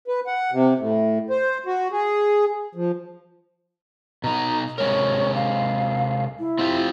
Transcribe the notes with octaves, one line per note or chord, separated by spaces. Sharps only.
B4
F#5
C3
A2
C5
F#4
G#4
F3
B2 D#4 A#5
C3 G#3 A#4 C#5
F5
E4
C4 F4 G4